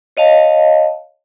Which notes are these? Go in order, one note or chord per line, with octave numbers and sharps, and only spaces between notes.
C#5 D#5 F5 A5